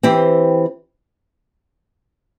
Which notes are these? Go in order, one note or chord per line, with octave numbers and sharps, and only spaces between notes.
E3 C4 G4 C5